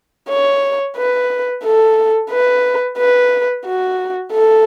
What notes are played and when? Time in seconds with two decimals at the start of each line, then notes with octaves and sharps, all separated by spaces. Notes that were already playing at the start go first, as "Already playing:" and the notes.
0.29 C#5
0.97 B4
1.64 A4
2.31 B4
2.98 B4
3.66 F#4
4.33 A4